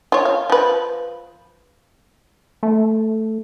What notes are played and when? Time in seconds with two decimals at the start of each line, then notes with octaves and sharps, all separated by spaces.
0.12 F4 C#5
0.25 F5
0.50 F3 B4
2.63 A3